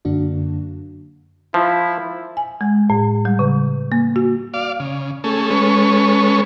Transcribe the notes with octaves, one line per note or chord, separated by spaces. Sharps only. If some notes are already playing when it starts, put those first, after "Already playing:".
F#2 D3 A#3 D4 F#4
F3 E4
G#5
G#3
A2
G3
C#3
A#3
F#4
D5 F5
C#3
A3 C#4 G#4 A4
G#3 C#4 A4 B4 C#5